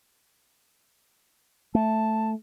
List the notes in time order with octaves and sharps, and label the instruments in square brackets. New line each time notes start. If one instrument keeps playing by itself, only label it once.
[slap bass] A3 [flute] A5